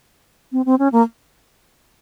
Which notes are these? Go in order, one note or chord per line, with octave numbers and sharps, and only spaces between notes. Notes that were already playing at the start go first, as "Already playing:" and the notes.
C4
C4
C#4
A#3